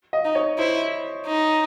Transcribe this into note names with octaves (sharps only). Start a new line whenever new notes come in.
D#5
D#4
C#5
E4 C5
D#4